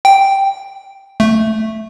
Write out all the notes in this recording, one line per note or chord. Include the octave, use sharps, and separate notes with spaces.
G5
A3